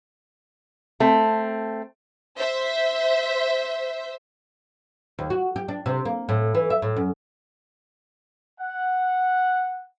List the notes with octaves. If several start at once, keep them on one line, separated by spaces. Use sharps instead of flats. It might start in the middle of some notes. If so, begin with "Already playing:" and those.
A3 C4
C5 E5
D#2
F#4
G4
D4
C3
A#3
A2
E3
E5
A2
F#2
F#5